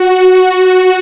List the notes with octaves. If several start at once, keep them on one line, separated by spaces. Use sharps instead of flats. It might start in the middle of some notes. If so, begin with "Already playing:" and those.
Already playing: F#4